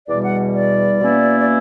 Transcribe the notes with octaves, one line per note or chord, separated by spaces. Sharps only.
E2 B2 G3 D5
F#5
D5
B2 A#3 C#4 E4
D5